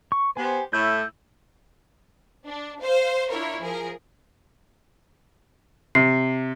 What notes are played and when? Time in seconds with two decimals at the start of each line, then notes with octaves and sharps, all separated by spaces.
0.12 C#6
0.37 B3 G4 C5 G#5
0.73 A2 E5 G6
2.47 D4
2.81 C5 F5
3.31 D4 E4 F4 A#4 C#5
3.60 F3 G#4 A#4
5.95 C3 C7